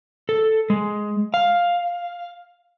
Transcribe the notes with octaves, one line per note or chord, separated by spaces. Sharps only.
A4
G#3
F5